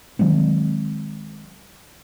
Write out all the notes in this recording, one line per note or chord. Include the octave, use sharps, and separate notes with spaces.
D#3 F#3 G#3 C4